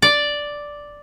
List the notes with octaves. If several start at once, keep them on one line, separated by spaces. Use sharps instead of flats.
D5